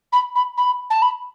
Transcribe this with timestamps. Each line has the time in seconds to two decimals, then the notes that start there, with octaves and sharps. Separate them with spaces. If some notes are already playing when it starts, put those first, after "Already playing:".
0.12 B5
0.35 B5
0.57 B5
0.90 A5
1.02 B5